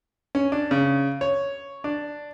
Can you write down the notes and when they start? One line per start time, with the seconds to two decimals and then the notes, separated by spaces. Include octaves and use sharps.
0.35 C#4
0.52 D4
0.71 C#3
1.21 C#5
1.84 D4